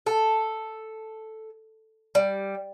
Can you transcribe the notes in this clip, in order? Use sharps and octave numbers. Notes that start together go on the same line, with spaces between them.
A4
G3